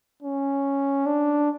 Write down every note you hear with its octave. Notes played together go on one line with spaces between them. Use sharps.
C#4
D4